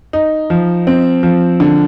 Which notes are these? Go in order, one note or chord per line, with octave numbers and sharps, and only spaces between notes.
D#4
F3
C4
F3
D3